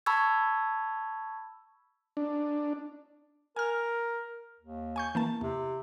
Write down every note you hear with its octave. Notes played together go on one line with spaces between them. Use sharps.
A5 B5 C#6 E6 G#6
D4
A#4 G#5 F6
D#2
G#5 C#6 G6
E3 A#3 A5
E2 C3